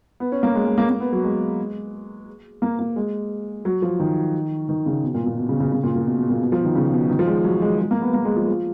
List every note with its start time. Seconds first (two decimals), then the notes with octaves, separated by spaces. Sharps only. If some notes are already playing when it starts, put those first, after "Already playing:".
0.20 B3
0.32 C#4
0.43 A#3
0.55 G#3
0.66 G#3
0.78 A#3
0.89 A#3
1.00 B3
1.12 F#3
1.24 G#3
2.62 A#3
2.79 A#3
2.96 G#3
3.65 F#3
3.82 F3
4.00 D#3
4.69 D#3
4.86 C#3
5.03 B2
5.14 A#2
5.26 A#2
5.37 B2
5.49 C#3
5.60 C#3
5.72 C#3
5.83 A#2
5.95 A#2
6.06 B2
6.18 B2
6.30 A#2
6.41 B2
6.52 F3
6.64 D#3
6.75 C#3
6.92 B2
7.10 D#3
7.19 F3
7.27 G#3
7.44 F#3
7.62 G#3
7.79 G#3
7.91 A#3
8.02 B3
8.13 A#3
8.25 G#3
8.36 F3
8.48 F3